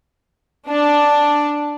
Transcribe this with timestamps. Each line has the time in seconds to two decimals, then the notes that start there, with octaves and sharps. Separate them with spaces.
0.69 D4